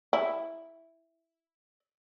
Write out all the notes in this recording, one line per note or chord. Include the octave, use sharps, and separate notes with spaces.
E4